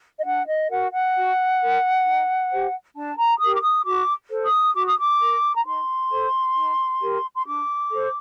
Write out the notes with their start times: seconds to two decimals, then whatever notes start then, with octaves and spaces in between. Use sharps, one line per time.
0.17 D#5
0.24 D4 F#5
0.47 D#5
0.69 F#4 A#4 F#5
0.91 F#5
1.15 F#4
1.60 A#4
2.05 D#4
2.50 G4 C5
2.95 D4 A5
3.17 A#5
3.40 G4 A#4 D#6
3.54 D6
3.62 D#6
3.85 F#4 D6
4.30 A4 C5
4.45 D#6
4.75 F#4 D6
4.86 D#6
4.98 D6
5.20 A#4
5.55 A#5
5.64 D#4 C6
6.10 A4 C5
6.55 D#4
7.01 G4 A#4
7.35 C6
7.45 D4 D6
7.90 A4 C5